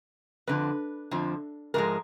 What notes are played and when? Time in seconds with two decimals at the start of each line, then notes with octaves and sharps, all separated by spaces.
0.47 F2 D3 F3 B4
1.11 F2 D3 F3
1.74 G#2 F3 G#3 A#4